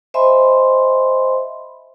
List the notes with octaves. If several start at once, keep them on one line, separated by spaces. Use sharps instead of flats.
C5 D#5 E5 G#5 B5 C6